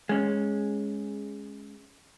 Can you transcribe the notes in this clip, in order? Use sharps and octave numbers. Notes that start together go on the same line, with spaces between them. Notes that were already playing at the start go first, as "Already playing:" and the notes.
G#3 C#4